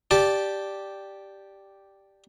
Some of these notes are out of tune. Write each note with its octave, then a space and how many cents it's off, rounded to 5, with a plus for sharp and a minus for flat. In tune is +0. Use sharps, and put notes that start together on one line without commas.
G4 +0 D5 +0 A5 -15